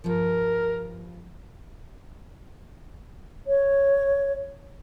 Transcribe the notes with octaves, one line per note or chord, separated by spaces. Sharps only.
G2 F3 A#4
C#5